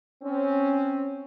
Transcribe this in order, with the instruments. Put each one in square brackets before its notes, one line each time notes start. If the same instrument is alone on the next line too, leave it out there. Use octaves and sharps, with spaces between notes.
[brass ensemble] C4 C#4